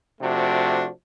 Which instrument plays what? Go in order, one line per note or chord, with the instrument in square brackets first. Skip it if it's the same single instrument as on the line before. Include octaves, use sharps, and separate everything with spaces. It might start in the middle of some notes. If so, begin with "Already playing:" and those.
[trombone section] C3 F3 A3 D4 F#4